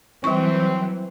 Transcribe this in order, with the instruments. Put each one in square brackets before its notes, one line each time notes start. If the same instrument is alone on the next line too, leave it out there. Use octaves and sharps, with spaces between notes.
[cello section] E3 F#3 [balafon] G3 C#6 [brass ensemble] C4